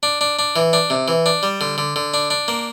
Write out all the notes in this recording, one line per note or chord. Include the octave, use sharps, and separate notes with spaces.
D4
D4
D4
E3
D4
C3
E3
D4
G3
D3
D3
D3
D4
D4
A#3